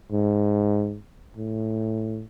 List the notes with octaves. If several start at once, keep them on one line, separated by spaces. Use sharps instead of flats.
G#2
A2